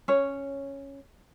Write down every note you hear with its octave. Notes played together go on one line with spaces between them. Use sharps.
C#4 C#5